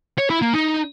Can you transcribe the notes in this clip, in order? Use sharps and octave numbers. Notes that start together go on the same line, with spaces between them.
C#5
E4
A#3
D#4